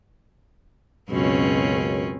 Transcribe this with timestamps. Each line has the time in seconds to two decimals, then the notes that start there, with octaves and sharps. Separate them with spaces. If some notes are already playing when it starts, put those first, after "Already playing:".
1.10 C#2 F#2 B2 C4 C#4